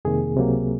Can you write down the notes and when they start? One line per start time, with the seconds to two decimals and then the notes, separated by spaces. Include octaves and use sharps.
0.05 F2 C3 D#3 A#3 G#4
0.36 C#2 C3 F#3 A#3